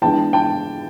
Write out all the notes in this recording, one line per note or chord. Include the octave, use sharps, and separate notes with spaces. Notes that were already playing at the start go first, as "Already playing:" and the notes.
E3 G#3 B3 D4 G5 A5
G5 A5